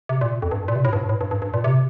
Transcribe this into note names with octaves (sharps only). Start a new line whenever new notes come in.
C3
A#2
F2
G2
A#2
C3
A2
G2
A2
G2
G2
G2
A#2
C3